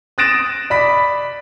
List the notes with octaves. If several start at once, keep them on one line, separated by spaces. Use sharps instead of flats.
D#6 F#6 A6 A#6 D7 E7
D5 B5 B6